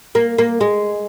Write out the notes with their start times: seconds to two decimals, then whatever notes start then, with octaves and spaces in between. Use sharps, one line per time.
0.15 A#3
0.38 A#3
0.61 G#3